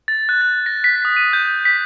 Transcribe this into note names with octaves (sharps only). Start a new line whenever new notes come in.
A6
F#6
A6
A#6
B6
D#6
D#7
G6
B6